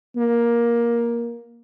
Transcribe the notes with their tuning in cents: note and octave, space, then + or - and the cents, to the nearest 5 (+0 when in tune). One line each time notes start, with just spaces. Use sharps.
A#3 +15